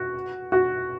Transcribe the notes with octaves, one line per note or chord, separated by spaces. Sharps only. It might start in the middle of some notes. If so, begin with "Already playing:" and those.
Already playing: F#4
F#4